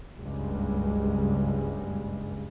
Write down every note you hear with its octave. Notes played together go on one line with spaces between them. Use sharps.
F#1 C#2 G2 G3 G#3